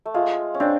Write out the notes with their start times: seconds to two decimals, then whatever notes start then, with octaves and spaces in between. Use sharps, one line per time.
0.06 A3
0.14 G#3 F4
0.54 C#4
0.60 C4 D4